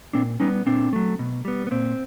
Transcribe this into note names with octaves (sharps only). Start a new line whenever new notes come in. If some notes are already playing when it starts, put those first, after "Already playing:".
A#2 C4 D4
G3 B3 C#4 D#4
A#2 C4 D4
F#3 A3
B2
G3 B3
B3
A#2 C4